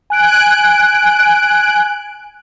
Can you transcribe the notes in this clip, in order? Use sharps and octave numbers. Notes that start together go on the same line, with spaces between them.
G#5 F#6 D7